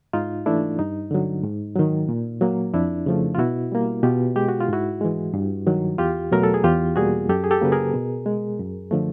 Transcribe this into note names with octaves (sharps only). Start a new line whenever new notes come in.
G#2 D#4 F4
E3 A3 D4 E4
G2 D#4
D3 F#3
G#2
D#3 F#3
A#2
F#3 A#3
F2 D4 E4
C#3 F3 A3
F4
B2 E4 F#4
G3 A#3
B2 F4 G4
G#3 G4
F#4
F4
G#2 E4 F#4
E3 G#3
G2
D#3 F#3
E2 F4 G4
B2 F#3 A3 A#4
A4
G#4
E2 F4 G4
B2 G3 A#3 F#4 G#4
F#2 G4 A4
G#4
G4 A4
C#3 F#3 A#3 B4
G#4 A#4
B2
G#3
F#2
D3 F3 A3